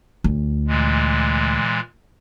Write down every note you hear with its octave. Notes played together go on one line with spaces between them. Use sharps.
D2
A#2 E3 G#3